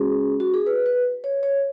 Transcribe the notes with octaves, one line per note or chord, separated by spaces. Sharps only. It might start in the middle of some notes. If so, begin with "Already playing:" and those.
Already playing: G#3 C#4 F#4 G#4
F#4
G#4
B4
B4
C#5
C#5